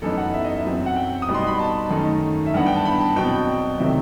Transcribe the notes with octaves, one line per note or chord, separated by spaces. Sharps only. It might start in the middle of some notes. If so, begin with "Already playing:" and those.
F#2 E3 B3 D#4 A4
F#5
E5
D#5
E5
F#2 F#3 C4
F#5
G5
D#6
B2 G3 B3 D#4
C6
B5
A5
F#2 D#3 A3 D#4
E5
G2 E3 B3 F#5
G5
A5
B5
A5
B2 F#3 C4 G5
C3 D#3 F#3 A3 C4 E5